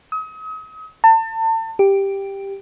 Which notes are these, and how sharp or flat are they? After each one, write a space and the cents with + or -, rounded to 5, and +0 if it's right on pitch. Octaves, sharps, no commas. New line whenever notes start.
D#6 +40
A5 +35
G4 +5